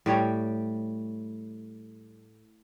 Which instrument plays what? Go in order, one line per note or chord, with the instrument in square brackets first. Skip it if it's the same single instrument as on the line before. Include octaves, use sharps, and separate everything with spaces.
[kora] A2 G3 C#5 G5